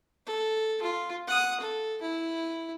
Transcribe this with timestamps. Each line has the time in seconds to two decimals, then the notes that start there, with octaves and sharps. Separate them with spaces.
0.26 A4
0.82 F4
1.27 F#5 D#6
1.60 A4
2.02 E4